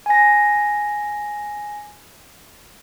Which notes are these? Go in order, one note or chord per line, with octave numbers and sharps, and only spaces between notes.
G#5 A#6